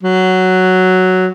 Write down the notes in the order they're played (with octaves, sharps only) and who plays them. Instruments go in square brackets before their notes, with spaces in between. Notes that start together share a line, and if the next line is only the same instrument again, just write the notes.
[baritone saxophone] F#3